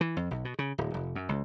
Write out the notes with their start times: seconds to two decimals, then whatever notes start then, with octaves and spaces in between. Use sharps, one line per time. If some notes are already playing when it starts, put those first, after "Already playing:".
0.01 E3
0.17 F2
0.31 B1
0.45 B2
0.59 C#3
0.78 D1
0.94 F1
1.15 F#2
1.29 C#2